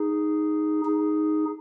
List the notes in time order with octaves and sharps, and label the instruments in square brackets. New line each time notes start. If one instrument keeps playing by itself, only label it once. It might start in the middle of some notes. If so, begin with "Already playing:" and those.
Already playing: [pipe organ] D#4 G#4
D#4 G#4